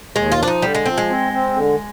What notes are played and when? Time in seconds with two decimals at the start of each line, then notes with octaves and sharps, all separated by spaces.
0.16 D#2 G#3
0.32 F4
0.39 F3 D4
0.48 D#4
0.62 D3 G3
0.75 G#3
0.85 F3 C4
0.98 G#3
1.10 C4
1.33 C4
1.56 D3